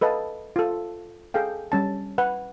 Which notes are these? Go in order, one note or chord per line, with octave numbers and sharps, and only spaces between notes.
A4 B4 D#5 F5 A5
F4 A4
G#4 A4 F5 G5
G3 C#4 A5
B4 F#5